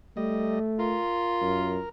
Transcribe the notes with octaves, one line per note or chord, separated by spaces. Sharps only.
G3 A3 D#5
F4 A#4
F#2